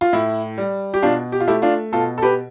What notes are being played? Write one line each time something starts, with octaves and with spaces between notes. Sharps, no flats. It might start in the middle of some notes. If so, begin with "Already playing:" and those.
F4
A2 E4
G3
G4
B2 D4 F4
G4
F4
A3 E4 G4
D4 F4
B2 F4 A4
A4
G4 B4